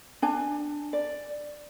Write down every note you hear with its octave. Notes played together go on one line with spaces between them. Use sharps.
D4 G#5
D5